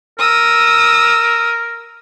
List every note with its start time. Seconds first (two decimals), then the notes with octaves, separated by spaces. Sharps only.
0.19 A#4 D#6 E6